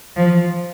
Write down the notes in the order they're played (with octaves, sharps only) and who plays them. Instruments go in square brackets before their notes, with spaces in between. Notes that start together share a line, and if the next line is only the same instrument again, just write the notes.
[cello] F3